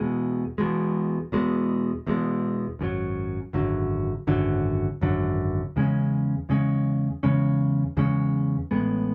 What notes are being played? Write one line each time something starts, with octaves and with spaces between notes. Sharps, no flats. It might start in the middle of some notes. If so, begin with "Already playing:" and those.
Already playing: E1 E2 B2 G#3
E1 E2 B2 G#3
E1 E2 B2 G#3
E1 E2 B2 G#3
G#1 F#2 D3 F#3
G#1 F#2 D3 F#3
G#1 F#2 D3 F#3
G#1 F#2 D3 F#3
E2 C#3 G#3 C#4
E2 C#3 G#3 C#4
E2 C#3 G#3 C#4
E2 C#3 G#3 C#4
A1 A2 G#3 B3